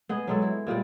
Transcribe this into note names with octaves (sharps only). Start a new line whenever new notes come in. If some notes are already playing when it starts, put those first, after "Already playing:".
B3 G#4 D#5
F#3 G#3 A4
E4
A#2 G3 G#3 D5